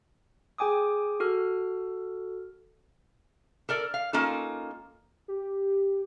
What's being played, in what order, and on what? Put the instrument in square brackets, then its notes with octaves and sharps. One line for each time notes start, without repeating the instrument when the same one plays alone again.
[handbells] G#4 G5 G#5 D6 D#6
F#4 A4 F6
[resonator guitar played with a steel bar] A4 A#4 D5
F5
A#3 C#4 D#4 F4 A4
[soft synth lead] G4